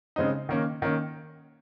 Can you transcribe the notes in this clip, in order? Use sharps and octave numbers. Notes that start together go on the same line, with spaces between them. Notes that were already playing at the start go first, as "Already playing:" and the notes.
C#3 G#3 C4 D#4
D#3 A#3 C#4
D#3 A#3 C#4